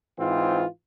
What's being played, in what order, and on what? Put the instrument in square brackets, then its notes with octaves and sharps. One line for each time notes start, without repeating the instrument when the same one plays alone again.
[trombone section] G#2 E3 C4 F4